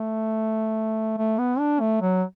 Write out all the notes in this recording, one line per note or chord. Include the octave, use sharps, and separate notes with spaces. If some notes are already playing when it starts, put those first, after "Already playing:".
Already playing: A3
A3
B3
D4
A3
F#3